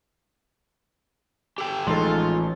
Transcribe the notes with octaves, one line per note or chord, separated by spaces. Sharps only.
G4 A4 G5
A1 F3 G#3 D#4 F4 A4